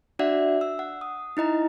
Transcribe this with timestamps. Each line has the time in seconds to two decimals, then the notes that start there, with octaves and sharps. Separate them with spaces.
0.19 D4 F#4 D5 E5 F#5
0.61 E6
0.79 F#5
1.01 D#6
1.37 D#4 E4 D#5 A#5